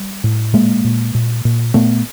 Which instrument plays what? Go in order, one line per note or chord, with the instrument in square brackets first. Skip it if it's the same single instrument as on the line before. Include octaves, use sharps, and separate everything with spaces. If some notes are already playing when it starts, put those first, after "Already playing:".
Already playing: [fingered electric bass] G3
A2
A#2 G#3 A#3
A#2
A#2
A#2
A#2 A3 B3